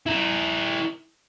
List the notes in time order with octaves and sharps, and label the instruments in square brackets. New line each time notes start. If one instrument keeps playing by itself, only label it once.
[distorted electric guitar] E4 A#4